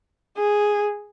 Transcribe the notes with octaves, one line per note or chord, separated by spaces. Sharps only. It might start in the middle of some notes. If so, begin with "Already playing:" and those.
G#4